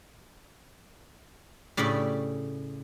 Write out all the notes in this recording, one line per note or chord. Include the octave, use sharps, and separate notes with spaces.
A2 C#3 G4 D5 B5